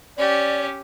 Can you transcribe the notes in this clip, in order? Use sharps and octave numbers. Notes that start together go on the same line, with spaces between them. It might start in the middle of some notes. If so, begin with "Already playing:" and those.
C#4 G4 D5